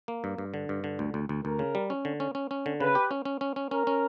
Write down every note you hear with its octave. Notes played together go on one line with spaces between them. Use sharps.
A#3
G2
G2
D3
G2
D3
D2
D2
D2
D2 A#4
C#3
G3
C#4
D3
C#4
C#4
C#4
D3
C#3 B4
G4
C#4
C#4
C#4
C#4
C#4 A#4
C#4